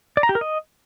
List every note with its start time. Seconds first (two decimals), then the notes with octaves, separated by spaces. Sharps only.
0.17 D5
0.23 A#5
0.29 G4
0.35 A#4
0.41 D#5